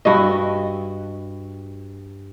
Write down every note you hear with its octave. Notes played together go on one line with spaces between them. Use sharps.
G2 F#4 D#5